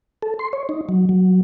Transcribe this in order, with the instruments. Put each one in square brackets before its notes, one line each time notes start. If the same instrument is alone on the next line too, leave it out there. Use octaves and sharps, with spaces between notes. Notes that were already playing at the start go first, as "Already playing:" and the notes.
[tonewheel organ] A4
C6
C#5
D#4
F#3
F#3